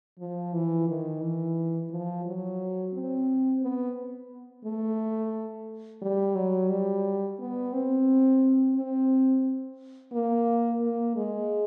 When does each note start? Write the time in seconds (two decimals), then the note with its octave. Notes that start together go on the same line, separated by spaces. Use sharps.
0.19 F3
0.53 E3
0.88 D#3
1.22 E3
1.91 F3
2.26 F#3
2.94 C4
3.62 B3
4.65 A3
6.02 G3
6.36 F#3
6.70 G3
7.39 B3
7.73 C4
8.75 C4
10.12 A#3
10.81 A#3
11.16 G#3